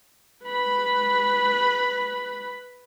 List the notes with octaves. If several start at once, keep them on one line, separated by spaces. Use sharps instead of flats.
B4 B5